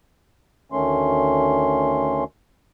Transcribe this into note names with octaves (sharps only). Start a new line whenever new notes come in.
D2 D#3 A3 C#4 C6